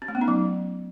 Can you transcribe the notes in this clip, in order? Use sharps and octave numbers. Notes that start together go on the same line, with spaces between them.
C#4
A3
B3
D#4
F#3